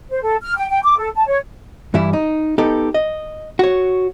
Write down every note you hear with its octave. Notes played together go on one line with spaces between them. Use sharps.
C5
A4
F6
G5
G5
D6
A4
A5
C#5
G2 E3 G3 E4
D#4
B3 D#4 G4 A4
D#5
F#4 C#5